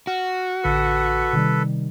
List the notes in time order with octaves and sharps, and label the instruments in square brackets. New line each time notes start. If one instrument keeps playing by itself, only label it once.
[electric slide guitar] F#4 [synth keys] F6
[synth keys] A1 D3 C#7 [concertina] A4 B4
[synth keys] C3 D#3 G3